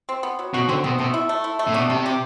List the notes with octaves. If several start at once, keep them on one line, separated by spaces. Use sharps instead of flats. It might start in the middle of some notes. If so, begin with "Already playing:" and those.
C4
B3
F#3
B2 F#4
D3 C4
B2 C4
B2 A3
E4
A3
E4
A3
A2
B2 D4
C3 G3
G4